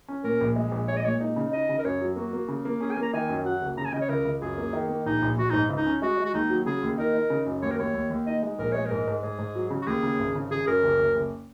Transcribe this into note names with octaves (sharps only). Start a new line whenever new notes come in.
C#4
A#2 A#4
A#1
G#3
A#1
G#3 C#5
D#5
A#2 C#5
D#4
C#3
D#4 D#5
C#3
A#4
F#2 C#5
F#3
A#3 F#4
A#3
C#3
A#3
C#4 G#4
G#5
A#3
A#5
D#3 G#5
F#2
F#3 F#5
F#1
C#3 A#5
G#5
C#3 D#5
C#5
C#2 A#4
C#2
F#2 G#4
A#3
D#3
A#3
A#1 D#4
A#1
A#1 F#4
G#2 D#4
C#2
D#4
C#4
G#3 F#4
G#3
F#4
D#2 D#4
F#3
C#3 G#4
D#2
D#4 A#4
D#4
C#3
F#2
D#2 C#5
A#4
D#2 C#5
D#2
D#2
D#4 D#5
G#3
A#1 A#4
G#3 C#5
A#4
G#2
G#2
G#2 G#4
G#2
F#3
C#3
F#4
D#2 G#4
C#3
G#1
C#3
C#3 G#4
F#2 A#4
F#1
F#1
F#1